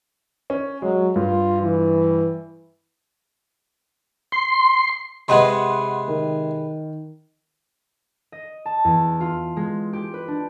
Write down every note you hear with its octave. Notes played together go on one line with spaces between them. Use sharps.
C#4
F#3 G#3
G2 F4
E3
C6
C3 G#3 G#4 B4 D#5 F#5 B5 C6
D#3
D#5
A5
E2
F4
G#3
G4
B4
D4